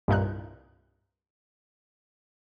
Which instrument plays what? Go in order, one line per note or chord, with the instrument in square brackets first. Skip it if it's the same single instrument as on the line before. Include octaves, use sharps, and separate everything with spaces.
[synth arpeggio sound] C2 G2 A#2 D#4 F6 F#6